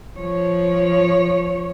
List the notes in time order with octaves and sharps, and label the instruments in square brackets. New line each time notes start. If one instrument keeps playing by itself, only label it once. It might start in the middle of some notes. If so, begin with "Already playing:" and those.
[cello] F3 C#5